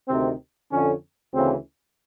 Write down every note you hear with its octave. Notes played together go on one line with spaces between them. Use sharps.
D2 C3 D#3 C4
F2 D3 C#4
D2 C#3 E3 C4